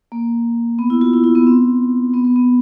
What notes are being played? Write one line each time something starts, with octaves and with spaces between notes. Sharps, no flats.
A#3
B3
E4
F4
E4
E4
B3
C4
B3
B3
B3